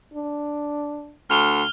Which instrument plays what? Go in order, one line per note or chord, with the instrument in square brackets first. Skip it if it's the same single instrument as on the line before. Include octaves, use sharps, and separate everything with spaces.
[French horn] D4
[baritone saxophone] D2 [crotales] F6 F7 G7